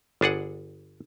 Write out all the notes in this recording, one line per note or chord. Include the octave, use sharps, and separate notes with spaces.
G1 D4 G#4 F#5